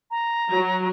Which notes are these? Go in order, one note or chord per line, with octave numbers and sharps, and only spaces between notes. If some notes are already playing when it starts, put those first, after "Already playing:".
A#5
F#3